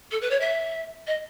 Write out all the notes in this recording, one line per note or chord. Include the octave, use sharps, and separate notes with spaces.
A4
B4
C#5
E5
D#5